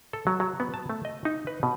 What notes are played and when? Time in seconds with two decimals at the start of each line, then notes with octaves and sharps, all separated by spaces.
0.13 A4
0.27 F#3
0.40 F#3
0.60 B3
0.74 A5
0.90 A3
1.05 D#5
1.25 D#4
1.47 B4
1.63 B2